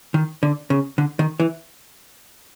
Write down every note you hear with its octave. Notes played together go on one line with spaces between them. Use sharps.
D#3
D3
C#3
D3
D#3
E3